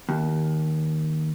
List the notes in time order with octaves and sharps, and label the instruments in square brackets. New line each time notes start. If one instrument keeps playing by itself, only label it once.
[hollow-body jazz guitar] D#2